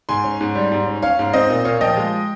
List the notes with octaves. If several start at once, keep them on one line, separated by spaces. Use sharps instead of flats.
G#2 G#5 C6
C#4
G#2
G3
G#2
C#4
C#4 C#5 F5
G#2
C4 C5 D#5
A#2
A#2 C#5 F5
F3 D#5 G5
G#3